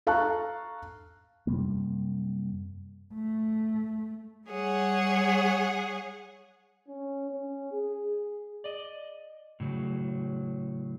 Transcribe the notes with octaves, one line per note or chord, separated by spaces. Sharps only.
A4 F5 A5 A#5 C#6 F#6
F#2 C3 G3 A#3
A3
G3 G#4 C#5 F#5
C#4
C#4
G#4
D5 D#5
A2 C#3 F#3